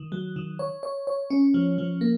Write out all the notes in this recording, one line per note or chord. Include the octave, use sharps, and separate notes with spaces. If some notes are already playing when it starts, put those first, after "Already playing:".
Already playing: D#3
F#3
D#3
C#5
C#5
C#5
C#4
F3
F3
A#3